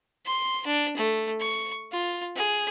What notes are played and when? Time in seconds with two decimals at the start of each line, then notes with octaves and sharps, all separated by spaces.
0.26 C6
0.66 D4
0.97 A3
1.40 C#6
1.92 F4
2.36 G#4